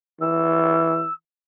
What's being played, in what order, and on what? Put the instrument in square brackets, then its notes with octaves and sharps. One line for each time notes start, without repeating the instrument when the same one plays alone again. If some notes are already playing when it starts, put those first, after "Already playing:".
[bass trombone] E3 [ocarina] E6